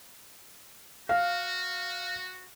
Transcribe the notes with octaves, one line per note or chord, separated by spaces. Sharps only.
F#4 F5